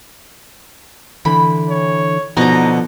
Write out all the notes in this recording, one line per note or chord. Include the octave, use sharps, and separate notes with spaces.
D3 E3 B5
C#5
B2 D3 F3 D#4 A#5